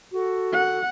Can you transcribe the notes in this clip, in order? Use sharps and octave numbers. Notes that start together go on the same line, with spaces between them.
F#4 A4
F#5